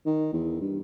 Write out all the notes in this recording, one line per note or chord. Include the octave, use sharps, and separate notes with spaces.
D#3
E2
G2